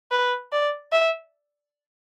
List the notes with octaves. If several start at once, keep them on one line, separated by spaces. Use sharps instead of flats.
B4
D5
E5